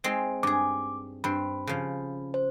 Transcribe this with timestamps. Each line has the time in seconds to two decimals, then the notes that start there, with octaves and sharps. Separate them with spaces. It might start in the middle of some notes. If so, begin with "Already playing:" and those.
0.04 G#3 C4 D#4
0.43 G2 G#4 D6
1.24 G2 C4 B5
1.67 C#3 F3
2.34 C5